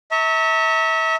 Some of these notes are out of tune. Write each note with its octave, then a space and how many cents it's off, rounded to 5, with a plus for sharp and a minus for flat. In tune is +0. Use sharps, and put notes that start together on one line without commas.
E5 -30 A#5 -45 C#6 +10